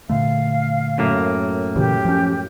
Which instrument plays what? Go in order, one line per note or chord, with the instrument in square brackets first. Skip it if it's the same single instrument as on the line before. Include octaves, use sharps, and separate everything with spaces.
[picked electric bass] A#2 D3 A3 [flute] F5
[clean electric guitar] F#2 A2 A#3
[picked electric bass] A#2 C#3 E3 [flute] G4
[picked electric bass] F3 C#4